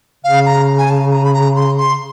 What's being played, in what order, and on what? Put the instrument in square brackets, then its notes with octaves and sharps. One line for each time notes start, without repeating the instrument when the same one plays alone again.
[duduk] C#3 [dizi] F5
[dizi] A#5
G#5
A5
A#5
B5
A#5
C6
C6